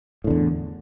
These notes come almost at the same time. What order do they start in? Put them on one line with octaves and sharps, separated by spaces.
A2 D3 E2